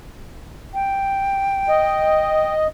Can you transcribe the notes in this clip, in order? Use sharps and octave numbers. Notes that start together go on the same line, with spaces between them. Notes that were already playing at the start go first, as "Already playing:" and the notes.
G5
D#5